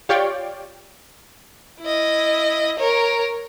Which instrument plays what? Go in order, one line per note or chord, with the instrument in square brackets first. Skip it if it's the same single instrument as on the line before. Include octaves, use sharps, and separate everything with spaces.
[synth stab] F4 G4 C#5 D5 F5 G5
[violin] E4 D#5
A#4 C#5